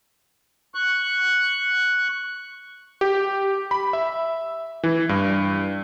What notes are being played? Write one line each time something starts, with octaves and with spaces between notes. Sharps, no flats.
C#6 F#6
G4
B5
E5
E3
G2